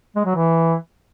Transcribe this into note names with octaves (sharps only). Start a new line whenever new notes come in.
G#3
F#3
E3